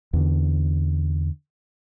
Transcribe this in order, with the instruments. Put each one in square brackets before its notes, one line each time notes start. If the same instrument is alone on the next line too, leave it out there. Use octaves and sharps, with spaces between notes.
[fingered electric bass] E2 D3